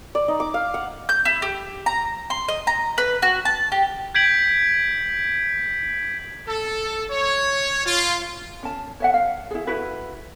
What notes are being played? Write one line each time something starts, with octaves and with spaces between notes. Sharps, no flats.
D5
D#4
D6
F5
F#5
G6
E4
G4
A#5
C6
D#5
A#5
B4
F#4
A5
G4
G6 G#6 B6 D7 F#7
A4
C#5
F4
C#4 A5
C#5 E5 F#5
F5
E4 G#4
E4 F#4 B4